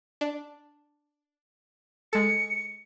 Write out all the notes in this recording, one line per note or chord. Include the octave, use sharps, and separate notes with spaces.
D4
G#3 A4 C#7